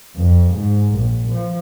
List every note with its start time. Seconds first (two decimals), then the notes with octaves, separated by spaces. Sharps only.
0.16 F2
0.53 G#2
0.95 A#1
1.28 F3